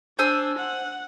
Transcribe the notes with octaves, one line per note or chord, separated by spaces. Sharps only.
D4 C5 G#5 E6
F#5